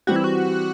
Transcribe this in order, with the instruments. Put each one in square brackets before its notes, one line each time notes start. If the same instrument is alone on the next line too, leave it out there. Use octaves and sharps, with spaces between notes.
[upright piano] E3 G3 C4 G4 [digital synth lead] F#4
[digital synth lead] E4
F#4